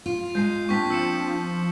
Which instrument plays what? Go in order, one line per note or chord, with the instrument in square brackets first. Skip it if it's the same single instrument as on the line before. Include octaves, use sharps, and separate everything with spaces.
[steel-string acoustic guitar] F4
[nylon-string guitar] G#3 G#5 [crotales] G6 C7
[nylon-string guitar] A#3 C4 D4 [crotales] C#6 B6
[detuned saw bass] F3 [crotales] E6 C#7 E7